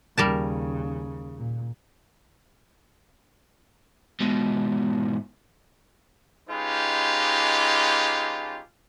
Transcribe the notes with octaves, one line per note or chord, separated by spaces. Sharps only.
D#2 C#3 G3 A#4 A5
A#2
G#2 B2
G#3 C#4 D#4 F4 G4 B4